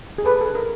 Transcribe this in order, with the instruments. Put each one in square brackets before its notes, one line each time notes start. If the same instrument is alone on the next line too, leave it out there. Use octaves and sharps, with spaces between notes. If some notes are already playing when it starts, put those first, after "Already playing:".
[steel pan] G#4
[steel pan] A4 [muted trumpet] B4
[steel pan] A4
A#4